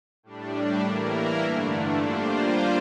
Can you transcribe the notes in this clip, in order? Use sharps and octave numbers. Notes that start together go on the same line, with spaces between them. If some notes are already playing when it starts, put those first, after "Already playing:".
A2 G3 D4
E3 A#3 E4 A#4
G2 D3 A3 D4
G3 A#3 D4 F4 C5